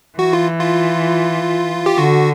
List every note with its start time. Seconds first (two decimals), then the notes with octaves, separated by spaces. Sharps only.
0.18 E3 F#4
0.33 F4
0.60 F4
1.86 G4
1.98 D3 F#4